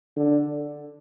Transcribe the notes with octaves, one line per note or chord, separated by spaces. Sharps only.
D3